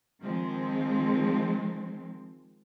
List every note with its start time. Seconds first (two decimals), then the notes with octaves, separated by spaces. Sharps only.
0.22 D#3 F3 G#3 C4